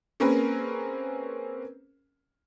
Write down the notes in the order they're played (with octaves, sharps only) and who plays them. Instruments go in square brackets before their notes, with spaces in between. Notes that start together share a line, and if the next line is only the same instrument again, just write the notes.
[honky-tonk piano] A#3 C4 C#4 G#4 A#4 B4